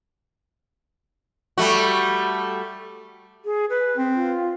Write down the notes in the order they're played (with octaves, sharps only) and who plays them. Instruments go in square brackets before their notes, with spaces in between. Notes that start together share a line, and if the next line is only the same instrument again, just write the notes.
[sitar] G3 A3 F#4
[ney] G#4
B4
[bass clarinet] C4
[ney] F4